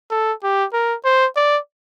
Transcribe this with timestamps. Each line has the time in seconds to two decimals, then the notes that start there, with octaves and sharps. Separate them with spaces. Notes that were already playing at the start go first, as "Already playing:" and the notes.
0.11 A4
0.43 G4
0.73 A#4
1.05 C5
1.36 D5